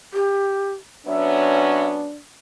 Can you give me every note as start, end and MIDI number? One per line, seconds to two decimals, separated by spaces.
0.14 0.71 67
1.07 2.09 54
1.07 2.09 59
1.07 2.09 61
1.07 2.19 62
1.07 1.87 76